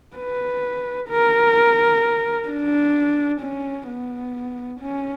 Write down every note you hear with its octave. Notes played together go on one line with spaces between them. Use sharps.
B4
A#4
D4
C#4
B3
C#4